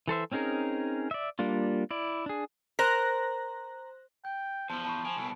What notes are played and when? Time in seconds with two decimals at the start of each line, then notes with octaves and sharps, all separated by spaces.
0.08 E3 A4 C5 E5
0.32 C4 C#4 D#4 G#4 A#4
1.11 D5 E5
1.39 G3 A#3 D4 F4
1.91 E4 D5
2.26 D4 G#4
2.79 A#4 C5 F#6 A#6
4.25 G5 G6
4.70 E2 F3 C5 A5
4.85 A5 B5 C#6
5.05 F3 G#5 D7
5.17 C2 B2